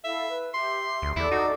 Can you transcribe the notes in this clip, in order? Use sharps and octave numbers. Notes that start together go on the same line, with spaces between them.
E4 A4 E5 F5
B4
G4 E5 C6
D2
E2 E4 A4 D5 D6
D#4 F#4